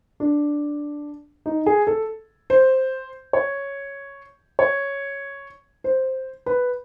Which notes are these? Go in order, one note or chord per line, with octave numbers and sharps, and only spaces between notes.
D4
D#4
G#4
A4
C5
C#5
C#5
C5
B4